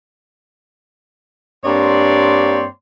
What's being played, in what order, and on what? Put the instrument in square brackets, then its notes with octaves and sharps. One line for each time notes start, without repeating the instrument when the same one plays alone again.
[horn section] G2 A#3 C4 C#5 D5 C6